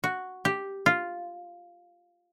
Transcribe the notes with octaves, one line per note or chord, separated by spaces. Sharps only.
F#4
G4
F4